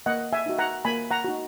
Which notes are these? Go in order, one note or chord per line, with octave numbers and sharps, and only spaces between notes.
A#3 D#5 F#5
E5 G#5
D#4 F#4
F#5 A#5
A#3 G#5 B5
F#5 A#5
D#4 F#4